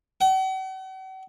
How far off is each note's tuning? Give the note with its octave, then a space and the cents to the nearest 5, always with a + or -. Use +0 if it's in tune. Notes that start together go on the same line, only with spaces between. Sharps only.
F#5 +45